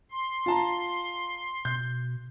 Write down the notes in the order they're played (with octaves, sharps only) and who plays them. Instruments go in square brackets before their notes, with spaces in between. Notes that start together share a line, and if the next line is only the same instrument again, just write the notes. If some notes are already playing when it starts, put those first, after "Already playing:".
[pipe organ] C6
[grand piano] F4 A5 A#5
[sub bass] B2 [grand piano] G6